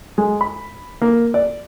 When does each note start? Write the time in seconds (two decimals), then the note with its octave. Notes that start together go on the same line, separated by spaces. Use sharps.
0.18 G#3
0.41 B5
1.02 A#3
1.34 D5